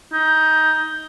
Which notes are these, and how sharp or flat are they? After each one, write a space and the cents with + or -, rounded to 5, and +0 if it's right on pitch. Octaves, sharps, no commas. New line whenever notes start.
D#4 +15